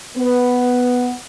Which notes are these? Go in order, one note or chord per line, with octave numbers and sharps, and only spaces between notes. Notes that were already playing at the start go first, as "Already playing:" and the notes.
B3 B4